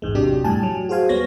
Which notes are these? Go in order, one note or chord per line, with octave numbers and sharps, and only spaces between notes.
A1 E2 G#2 G#3
A1 E2 C3 F#3 D4 G4
F#2 A2 G3 G4 G#5 A5
F#3
F#4 G#4 C5 F5 G#5
D#2 G3 B3 C#5 A#6